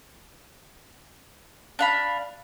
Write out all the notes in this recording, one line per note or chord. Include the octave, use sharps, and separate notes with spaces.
D4 F5 B5